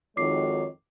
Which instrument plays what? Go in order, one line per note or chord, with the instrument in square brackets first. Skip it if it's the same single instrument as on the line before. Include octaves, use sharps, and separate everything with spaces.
[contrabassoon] F2 [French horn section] D#3 G#3 F#4 [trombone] C#5 [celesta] D6 C7